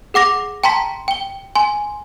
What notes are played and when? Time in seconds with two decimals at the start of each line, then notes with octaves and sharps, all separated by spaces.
0.14 G#4 F#5 D6 A#6 F7
0.64 G5 A5 A#5 C6 B6
1.08 G5 G7
1.56 G#5 C6